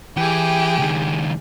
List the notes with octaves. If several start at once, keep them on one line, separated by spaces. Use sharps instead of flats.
E3 G4 G#4 G5
C#2 D#3